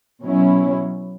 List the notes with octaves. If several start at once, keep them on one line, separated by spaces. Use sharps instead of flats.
B2 F#3 C#4 E4